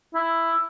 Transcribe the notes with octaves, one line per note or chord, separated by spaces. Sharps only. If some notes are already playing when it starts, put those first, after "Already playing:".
E4